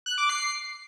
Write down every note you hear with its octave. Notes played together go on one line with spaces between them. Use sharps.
F#6
D6
C7